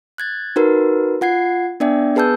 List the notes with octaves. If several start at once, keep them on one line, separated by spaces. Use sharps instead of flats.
F#6 G#6 A6
D#4 F#4 A#4 B4
F4 F#5 G#6 C7
B3 D4 D5 E5 G5
B3 G#4 B4 A5 E6 G6